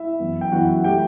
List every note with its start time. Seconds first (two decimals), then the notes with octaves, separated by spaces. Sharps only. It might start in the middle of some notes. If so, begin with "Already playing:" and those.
Already playing: E4 E5
0.19 F#2 E3 B3
0.41 G5
0.52 F#2 E3 B3 F#4 F#5
0.84 E3 A3 G4 G5